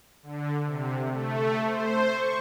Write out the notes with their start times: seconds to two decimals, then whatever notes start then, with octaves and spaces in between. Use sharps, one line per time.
0.23 D3
0.66 C3
1.09 A3
1.65 C5
2.08 C#6